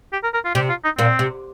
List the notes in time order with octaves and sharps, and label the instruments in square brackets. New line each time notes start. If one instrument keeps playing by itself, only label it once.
[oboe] G4
A#4
A#4
F4
[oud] C3 C4 [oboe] G4
[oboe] F4
D#4
[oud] A#2 A#3 [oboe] C4
[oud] C3